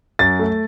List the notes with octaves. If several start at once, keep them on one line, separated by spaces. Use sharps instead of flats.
F#2 A6
A3